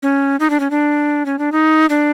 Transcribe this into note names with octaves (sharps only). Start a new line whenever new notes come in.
C#4
D#4
D4
C#4
D4
C#4
D4
D#4
D4